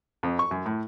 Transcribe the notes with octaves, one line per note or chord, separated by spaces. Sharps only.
F2
C#6
F#2
A2